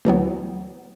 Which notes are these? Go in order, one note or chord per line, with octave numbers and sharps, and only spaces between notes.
D2 E3 F#3 B3